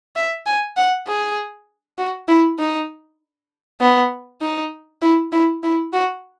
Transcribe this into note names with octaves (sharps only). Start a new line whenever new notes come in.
E5
G#5
F#5
G#4
F#4
E4
D#4
B3
D#4
E4
E4
E4
F#4